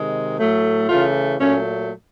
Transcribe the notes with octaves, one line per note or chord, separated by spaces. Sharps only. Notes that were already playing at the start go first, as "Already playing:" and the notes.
Already playing: C3 D#3 G#3
A2 F#3 A3
C#3 E3 A3 F4
A#2 F#3 A3 C#4